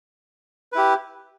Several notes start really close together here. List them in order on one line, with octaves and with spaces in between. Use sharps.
B4 E4 G4